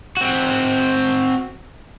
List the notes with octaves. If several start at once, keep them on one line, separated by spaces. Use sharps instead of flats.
C4 F#4